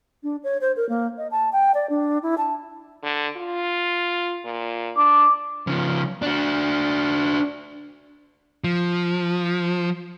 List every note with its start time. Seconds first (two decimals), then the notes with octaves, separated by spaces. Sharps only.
0.23 D4
0.43 C#5
0.61 C5
0.76 A#4
0.89 A#3
1.18 D#5
1.31 A5
1.53 G5
1.74 D5
1.89 D4
2.23 E4
2.38 A5
3.03 D3
3.37 F4
4.45 A#2
4.97 D4 D6
5.67 C#3 F3
6.22 D4 F#4
8.64 F3